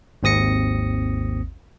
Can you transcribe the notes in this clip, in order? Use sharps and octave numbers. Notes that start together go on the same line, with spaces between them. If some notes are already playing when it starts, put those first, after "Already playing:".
G#1 D#2 C4 D#6 A#6 C#7